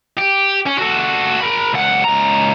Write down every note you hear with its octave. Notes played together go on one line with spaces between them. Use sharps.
G4
C#4
F#4 A4
A#4 B5
C#2 F#5
C#2 A#5